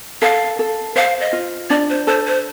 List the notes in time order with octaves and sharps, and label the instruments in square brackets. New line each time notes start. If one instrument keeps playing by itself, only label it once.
[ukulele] A4 [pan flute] F5
[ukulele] A4
[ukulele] C5 [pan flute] F5
[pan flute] D#5
[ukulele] F4
[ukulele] D4 [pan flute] D5
[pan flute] C5
[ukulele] A4 [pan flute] C5
[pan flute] C5